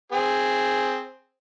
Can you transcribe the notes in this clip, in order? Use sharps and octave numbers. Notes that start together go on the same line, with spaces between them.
C4 G#4